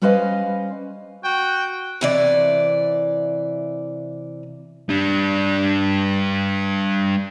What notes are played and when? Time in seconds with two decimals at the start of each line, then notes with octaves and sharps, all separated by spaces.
0.02 G3 C#4 B4 C5 D#5 F5
1.25 F#4 G5
2.01 C3 E3 D5
4.89 G3 D4